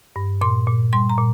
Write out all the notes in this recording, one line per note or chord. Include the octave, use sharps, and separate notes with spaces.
G2
A#2 C6
A#2
G3 C6
A#5
A#2